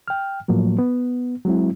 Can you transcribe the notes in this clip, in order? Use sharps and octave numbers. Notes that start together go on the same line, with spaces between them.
G5 F6
A2 F3 F#3 A#3
B3
F#3 G#3 C4 E4